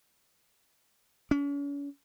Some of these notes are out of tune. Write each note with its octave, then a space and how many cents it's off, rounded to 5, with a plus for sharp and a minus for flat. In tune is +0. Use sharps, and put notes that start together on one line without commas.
C#4 +40